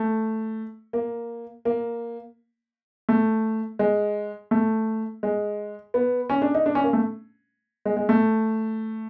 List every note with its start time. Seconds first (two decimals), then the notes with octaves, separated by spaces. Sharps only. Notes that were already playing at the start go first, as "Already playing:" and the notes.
Already playing: A3
0.93 A#3
1.65 A#3
3.09 A3
3.79 G#3
4.51 A3
5.23 G#3
5.94 B3
6.30 C#4
6.42 D4
6.54 D#4
6.66 D4
6.75 C#4
6.84 A#3
6.93 A3
7.86 G#3
7.97 G#3
8.09 A3